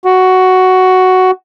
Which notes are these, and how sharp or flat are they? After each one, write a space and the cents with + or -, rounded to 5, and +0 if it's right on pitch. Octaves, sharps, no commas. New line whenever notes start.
F#4 +5